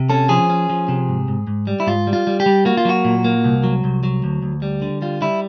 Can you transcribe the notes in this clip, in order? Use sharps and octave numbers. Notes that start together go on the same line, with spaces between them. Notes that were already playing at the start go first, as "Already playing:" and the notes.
Already playing: C3
C#4 A4
F3 G#4
C#4
F3
C3
G#2
G#2
G#2
G3
E4
G#2 F4
G3
F4
G3
G4
G3
A#3 F#4
F4
F#3 F#4
A#2
A#3
C2
F#3
C2
F#3
D2
D2
G3
D3
G3 F4
G3 E4